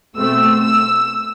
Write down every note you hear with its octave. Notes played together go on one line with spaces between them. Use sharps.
B2 A3 C4 E6
E6